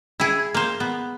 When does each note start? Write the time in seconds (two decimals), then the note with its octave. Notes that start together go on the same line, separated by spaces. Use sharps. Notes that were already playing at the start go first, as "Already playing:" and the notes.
0.20 E4 G#4
0.54 A#3 C5
0.80 B3